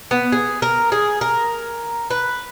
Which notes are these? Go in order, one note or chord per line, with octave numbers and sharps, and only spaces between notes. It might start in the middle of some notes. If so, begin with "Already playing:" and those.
B3
G#4
A#4
G#4
A#4
B4